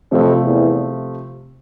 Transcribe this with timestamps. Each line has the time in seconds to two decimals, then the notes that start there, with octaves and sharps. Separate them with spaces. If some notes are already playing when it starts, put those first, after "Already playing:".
0.11 F2 C3 F3 A3 C4 F4
0.44 E2